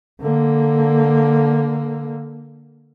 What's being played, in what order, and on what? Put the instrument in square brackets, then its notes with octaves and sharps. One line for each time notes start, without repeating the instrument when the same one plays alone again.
[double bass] D3 A#3